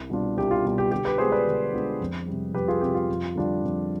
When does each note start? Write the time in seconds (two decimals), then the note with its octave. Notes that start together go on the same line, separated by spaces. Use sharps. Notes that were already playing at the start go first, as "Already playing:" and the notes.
Already playing: C2
0.10 B2 G3 D4 F4
0.37 C2 G4
0.51 F4
0.64 B2 G3 D4 F4
0.78 G4
0.91 D3 G4
1.05 G4 B4
1.18 G#3 B3 D4 F4 G#4 C5
1.32 B4 D5
1.46 D3
1.73 G#3 B3 D4 F4
2.01 F2
2.28 C3 G3
2.54 F2 G4 B4
2.68 F4 G#4
2.81 C3 G3 G4
2.94 F4
3.09 F2
3.35 D3 G3 D4 F4
3.63 F2